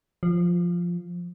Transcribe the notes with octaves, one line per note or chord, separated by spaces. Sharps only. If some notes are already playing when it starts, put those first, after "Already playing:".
F3